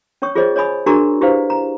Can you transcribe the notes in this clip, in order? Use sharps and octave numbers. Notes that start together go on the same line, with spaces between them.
C#4 C#5 G5 C#6 D#6
F4 G#4 C5 C#5 D#5
C#5 D#5 G#5 B5 D#6
D4 F#4 G#4 A#4 A#5 C#6
E4 G4 B4 C5 D5 F5
A#5